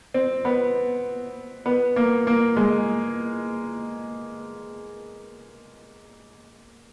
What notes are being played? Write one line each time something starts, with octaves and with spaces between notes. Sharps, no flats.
C4
B3
B3
A#3
A#3
G#3